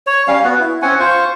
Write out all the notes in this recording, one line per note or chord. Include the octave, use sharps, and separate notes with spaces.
C#5
G3 C#4 F5
B3 F#4
E4
C4 C#4 F#5 G#5
F4 C5 C#6